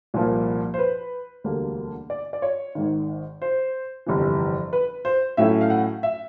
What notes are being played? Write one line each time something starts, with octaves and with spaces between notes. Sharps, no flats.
C2 A#2 F3 A#3
C5
B4
E1 D2 D3 G3 A#3
D5
D5
C#5
G#1 G#2 D#3
C5
G1 F2 C3 E3
B4
C5
A2 F#3 A3 C#4 E4 E5
F5
F#5
E5